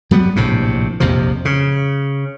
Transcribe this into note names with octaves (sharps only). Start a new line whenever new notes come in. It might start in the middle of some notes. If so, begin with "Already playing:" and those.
F#3 G3 B3
A#1 A2 C3
A#1 F2 C3 F3
C#3